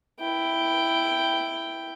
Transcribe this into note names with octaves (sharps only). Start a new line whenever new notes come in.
E4 G5